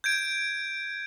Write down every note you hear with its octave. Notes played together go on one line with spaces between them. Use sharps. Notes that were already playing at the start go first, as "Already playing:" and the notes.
G6 G#6 D7